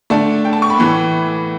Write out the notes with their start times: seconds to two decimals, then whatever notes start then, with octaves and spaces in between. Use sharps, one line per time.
0.10 D3 A3 D4 A5
0.45 G5
0.53 A5
0.62 C#6
0.70 B5
0.79 A2 E3 A3